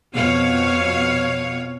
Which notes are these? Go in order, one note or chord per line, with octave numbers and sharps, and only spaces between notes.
F2 B2 C#5 F5